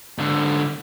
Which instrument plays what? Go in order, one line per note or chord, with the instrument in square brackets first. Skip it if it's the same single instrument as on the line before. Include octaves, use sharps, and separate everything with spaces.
[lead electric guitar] G#2 D3